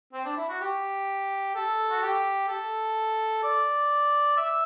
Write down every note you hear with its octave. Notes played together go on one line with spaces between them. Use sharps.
C4
D4
E4
F#4
G4
A4
F#4
G4
A4
D5
E5